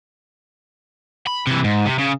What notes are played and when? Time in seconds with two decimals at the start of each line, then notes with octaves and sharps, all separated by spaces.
1.27 B5
1.47 C3 E3
1.64 G#2
1.86 C3
1.99 C#3